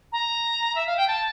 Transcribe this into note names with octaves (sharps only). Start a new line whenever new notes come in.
A#5
E5
F5
G5
A5